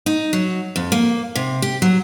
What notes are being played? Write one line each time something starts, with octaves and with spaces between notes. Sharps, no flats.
D#4
F#3
F2
A#3
C3
G4
F#3